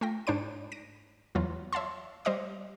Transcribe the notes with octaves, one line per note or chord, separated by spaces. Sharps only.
A3 F4 G5 A#6
G#2 D4 C5 C#5 B5 D7
A#6 D7 D#7
E2 E3 F#3 F4
C#5 E5 F5 A5 C6
G3 C5 D#5 F5 D6